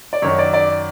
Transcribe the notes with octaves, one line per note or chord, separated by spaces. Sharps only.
D5
F#2 D#3 C#5
D5
D5